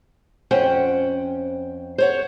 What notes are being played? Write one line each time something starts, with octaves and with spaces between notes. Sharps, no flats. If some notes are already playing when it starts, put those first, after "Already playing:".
F2 C#4 C5 F#5 G5
C5 C#5 F#5